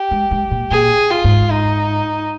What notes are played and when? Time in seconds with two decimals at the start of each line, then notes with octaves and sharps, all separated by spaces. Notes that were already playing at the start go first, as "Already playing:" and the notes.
Already playing: G4
0.11 G#3
0.31 G#3
0.51 A#2
0.71 A#2 G#4
1.11 F4
1.24 G#2
1.51 D#4